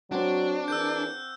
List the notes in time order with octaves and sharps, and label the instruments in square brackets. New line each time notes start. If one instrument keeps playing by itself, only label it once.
[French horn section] F#3 [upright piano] C4 F#4 [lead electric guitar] D4
[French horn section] E3 G#4 A#4 [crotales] E6 F#6 G6